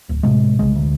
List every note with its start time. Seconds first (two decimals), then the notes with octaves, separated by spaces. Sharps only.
0.09 D1
0.23 A2 C3 G#3
0.59 B1 C#3 G#3
0.76 D2